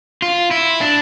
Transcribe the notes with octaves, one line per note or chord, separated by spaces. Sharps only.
F4
E4
D4